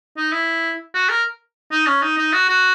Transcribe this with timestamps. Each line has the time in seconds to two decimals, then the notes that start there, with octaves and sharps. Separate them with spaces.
0.17 D#4
0.32 E4
0.94 F#4
1.09 A#4
1.72 D#4
1.87 C#4
2.02 D#4
2.17 D#4
2.33 F#4
2.49 F#4